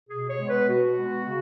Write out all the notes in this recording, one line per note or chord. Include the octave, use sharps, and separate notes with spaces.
B2 G#4
C#5
G#3 B3
B4
B2 F#4
G#3 B3
C#3